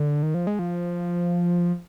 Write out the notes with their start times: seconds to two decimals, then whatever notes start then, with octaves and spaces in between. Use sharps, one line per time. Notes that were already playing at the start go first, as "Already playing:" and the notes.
Already playing: D3
0.22 D#3
0.34 F3
0.47 G#3
0.59 F3